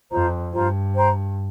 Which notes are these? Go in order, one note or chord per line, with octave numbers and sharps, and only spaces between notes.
F2 F4 C5 A#5
G2 F4 C5 A#5
C5 G5 A#5